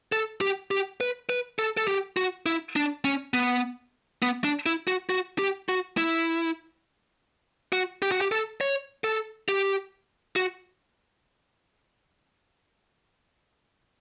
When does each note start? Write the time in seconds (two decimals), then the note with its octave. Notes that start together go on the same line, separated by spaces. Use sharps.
0.12 A4
0.41 G4
0.71 G4
1.01 B4
1.29 B4
1.59 A4
1.77 A4
1.88 G4
2.17 F#4
2.46 E4
2.76 D4
3.05 C#4
3.34 B3
4.22 B3
4.44 D4
4.66 E4
4.87 F#4
5.09 F#4
5.39 G4
5.69 F#4
5.97 E4
7.73 F#4
8.02 G4
8.12 F#4
8.21 G4
8.32 A4
8.61 C#5
9.04 A4
9.49 G4
10.36 F#4